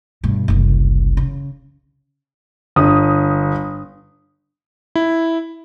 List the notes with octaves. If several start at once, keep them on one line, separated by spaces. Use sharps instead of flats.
G2 B2
F#1 C2
C#3
G1 D#6
E4